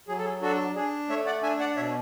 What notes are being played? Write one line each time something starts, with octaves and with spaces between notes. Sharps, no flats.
F#3 G#4
A4
G#4
D4 F#4 A4
D4 G#4
A3 C#5 E5
D5 F#5
D4 E5 G#5
D5 F#5
B2 C#5 E5